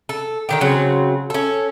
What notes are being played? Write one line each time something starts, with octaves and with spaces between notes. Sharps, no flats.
A4
D3 D#3 G4
C#3 F#3 C4
C#4 A4